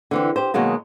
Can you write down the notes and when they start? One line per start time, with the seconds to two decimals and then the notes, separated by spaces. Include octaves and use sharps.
0.11 D3 E3 C4
0.36 G4 C5
0.54 B2 D#3 F#3 G#3 A#3